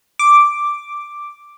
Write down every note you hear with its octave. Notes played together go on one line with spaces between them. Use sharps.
D6